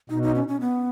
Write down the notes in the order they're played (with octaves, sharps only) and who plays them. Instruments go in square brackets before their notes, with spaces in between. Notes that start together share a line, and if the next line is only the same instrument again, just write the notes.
[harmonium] B2 [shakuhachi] D#4
[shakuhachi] D#4
C#4
C#4
B3